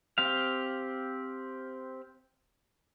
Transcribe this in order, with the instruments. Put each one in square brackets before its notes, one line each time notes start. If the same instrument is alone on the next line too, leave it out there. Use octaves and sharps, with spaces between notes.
[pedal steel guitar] C4 G4 F5